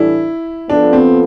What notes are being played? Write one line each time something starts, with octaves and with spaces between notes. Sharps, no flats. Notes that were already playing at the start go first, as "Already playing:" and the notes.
Already playing: A2 E3 G3 D4 E4 A4
F3 B3 D4 F4 A4
C4